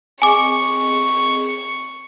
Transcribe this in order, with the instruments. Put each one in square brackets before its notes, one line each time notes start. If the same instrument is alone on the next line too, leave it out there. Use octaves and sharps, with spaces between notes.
[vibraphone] C4 G#4 D#5 [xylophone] G#5 D6 [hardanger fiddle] C#6